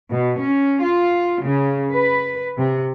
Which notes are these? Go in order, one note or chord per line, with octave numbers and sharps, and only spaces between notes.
B2
C#4
F4
C#3
B4
C3